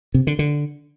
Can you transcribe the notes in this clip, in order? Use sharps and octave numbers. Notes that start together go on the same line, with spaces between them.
C3
D3
D3